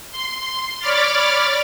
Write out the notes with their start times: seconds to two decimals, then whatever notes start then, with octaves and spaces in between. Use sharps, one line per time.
0.11 C6
0.79 C#5 D5 B5 D6 F6 A6